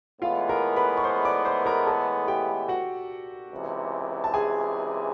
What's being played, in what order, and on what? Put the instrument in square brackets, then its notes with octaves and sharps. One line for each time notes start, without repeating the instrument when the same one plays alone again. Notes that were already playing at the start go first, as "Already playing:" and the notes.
[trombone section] A2 E3 G#3 B3 [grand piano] F4 F5
[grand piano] A#4 A#5
B4 B5
C#6
C5 C6
D5 D6
C5 C6
A#4 A#5
A4 A5
G4 G5
F#4 F#5
[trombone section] C#2 C3 E3
[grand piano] A5
G#4 G#5